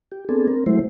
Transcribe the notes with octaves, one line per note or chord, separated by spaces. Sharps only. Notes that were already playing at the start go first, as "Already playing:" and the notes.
G4
B3 C4 D4 G#4 A4
C4 A#4
F#3 G#3 A3 E4 C5